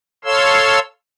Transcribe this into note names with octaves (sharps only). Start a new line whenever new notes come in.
A4 C#5 F5 C6 E6